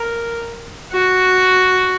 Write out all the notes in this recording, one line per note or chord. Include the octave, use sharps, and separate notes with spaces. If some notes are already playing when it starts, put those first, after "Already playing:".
Already playing: A#4
F#4